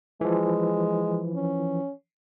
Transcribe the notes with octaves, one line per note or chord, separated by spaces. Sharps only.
E3 F3 G#3
C#4